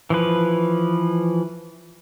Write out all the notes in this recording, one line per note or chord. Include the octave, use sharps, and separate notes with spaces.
E3 F3 B4